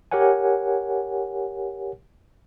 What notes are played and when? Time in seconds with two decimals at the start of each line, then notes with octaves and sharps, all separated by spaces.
0.11 G4 A#4 C#5 F#5 G#5